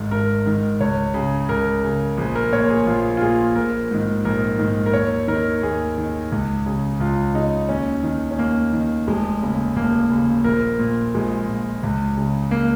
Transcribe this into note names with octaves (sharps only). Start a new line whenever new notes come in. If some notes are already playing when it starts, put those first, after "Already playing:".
Already playing: G#1 G#2 D#3
G#1 A#4
G#2 D#3
C#2 C#5
C#3
C#2 A#4
C#3
A#1 G#4
A#4
A#2 C#5
G#4
A#1 F4
F4
A#2 G#4
A#1 A#4
G#2 D#3
A#1 A#4
G#2 D#3
A#4
D#2 C#5
D#3 A#4
D#2 G#4
D#3
C#2
C#3
C#2 F4
C#3 D#4
D#2 C#4
D#3
C#4
D#2 A#3
D#3
F1 G#3
D#2 C#3
F1 A#3
D#2 C#3
A#1 A#4
A#2
A#1 G#3
A#2
C#2
C#3
A#3